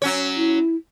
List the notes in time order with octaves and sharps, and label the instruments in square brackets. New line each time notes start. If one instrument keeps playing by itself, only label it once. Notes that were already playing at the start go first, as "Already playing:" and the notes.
[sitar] F#3 C#4 C#5
[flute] E4